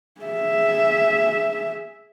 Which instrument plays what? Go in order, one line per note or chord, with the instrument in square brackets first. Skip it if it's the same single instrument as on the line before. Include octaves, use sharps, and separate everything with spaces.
[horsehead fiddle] G#4 E5